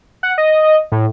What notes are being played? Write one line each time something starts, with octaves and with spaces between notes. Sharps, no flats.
F#5
D#5
A2